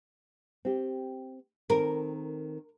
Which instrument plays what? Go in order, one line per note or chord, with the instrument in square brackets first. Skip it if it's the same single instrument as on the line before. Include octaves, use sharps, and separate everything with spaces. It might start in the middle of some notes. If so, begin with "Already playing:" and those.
[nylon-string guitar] C4 G4
[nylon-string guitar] D#3 C4 A4 [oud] A#4